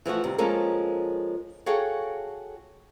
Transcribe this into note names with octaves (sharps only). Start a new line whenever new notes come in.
E3 F3 A3 F#4
D#2 C3 G3
F3 G#3 A#3 C#4 A4 A#4
F#4 G#4 A4 C#5 F5 G5